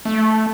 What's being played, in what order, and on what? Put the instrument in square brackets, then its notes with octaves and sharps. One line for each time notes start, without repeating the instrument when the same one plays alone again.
[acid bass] A3